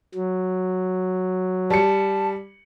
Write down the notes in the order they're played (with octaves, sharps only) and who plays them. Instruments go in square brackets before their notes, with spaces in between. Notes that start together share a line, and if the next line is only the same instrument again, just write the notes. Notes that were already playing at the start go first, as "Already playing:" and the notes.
[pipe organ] F#3
[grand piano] G3 C#7 [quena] A5